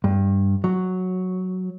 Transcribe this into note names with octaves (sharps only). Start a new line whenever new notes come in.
G2
F#3